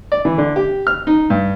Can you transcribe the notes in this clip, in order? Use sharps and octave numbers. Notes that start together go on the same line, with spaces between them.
D5
E3
D3
G4
F6
D#4
G2